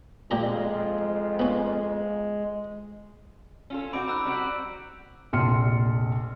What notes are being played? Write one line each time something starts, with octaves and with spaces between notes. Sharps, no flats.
F2 A#2 G#3 G4 A#5
B3 C#4
C#4 F4 A4
C4 D#4 F#4 B5 D6 D7
A#5 E6 F#6
G3 C4 F#4
F1 A#1 C6 F6 C#7